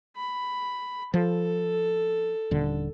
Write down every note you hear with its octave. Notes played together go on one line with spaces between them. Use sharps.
B5
F3 A4
D#1 D3